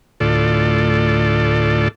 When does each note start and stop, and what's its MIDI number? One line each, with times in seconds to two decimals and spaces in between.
0.20 1.88 38
0.20 1.88 45
0.20 1.88 65
0.20 1.88 69
0.20 1.88 74